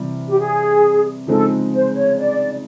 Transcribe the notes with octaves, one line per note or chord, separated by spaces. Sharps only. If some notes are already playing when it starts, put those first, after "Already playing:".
Already playing: C3 E3 G3
G4
G#4
C#3 F3 G#3 C4 D#4 A4
C5
C#5
D5